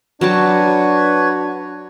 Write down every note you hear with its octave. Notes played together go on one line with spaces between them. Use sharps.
F#3 D4 F#4 B4 C#5 G5 A5